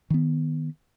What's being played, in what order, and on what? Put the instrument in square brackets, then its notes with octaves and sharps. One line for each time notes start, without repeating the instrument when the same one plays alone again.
[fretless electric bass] D#3 B3